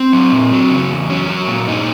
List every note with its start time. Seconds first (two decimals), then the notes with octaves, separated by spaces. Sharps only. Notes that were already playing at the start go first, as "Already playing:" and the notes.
Already playing: C4
0.13 F#3
0.32 A#2
0.52 F#3
0.70 C#3
0.91 E2
1.10 F#3 C#4
1.29 F#3
1.48 A#2
1.68 G2 D#4